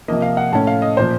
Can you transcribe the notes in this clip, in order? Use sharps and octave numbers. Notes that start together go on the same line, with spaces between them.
C3 F3 A#3 D#5
F5
F#5
A2 A3 C#4 A5
F5
D#5
A#2 F3 C5